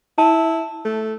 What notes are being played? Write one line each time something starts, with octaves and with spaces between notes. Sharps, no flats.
E4 A5
A3